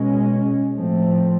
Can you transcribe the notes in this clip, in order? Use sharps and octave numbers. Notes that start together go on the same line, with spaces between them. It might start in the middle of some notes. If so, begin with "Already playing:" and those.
Already playing: B2 G#3 C#4
A2 F3 A3 C4